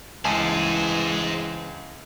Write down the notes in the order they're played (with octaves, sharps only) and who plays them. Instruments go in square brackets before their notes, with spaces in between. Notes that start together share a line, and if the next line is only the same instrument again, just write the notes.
[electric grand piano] C#2 G#5 A5 [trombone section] E3 G#3 [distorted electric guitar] C5 D#5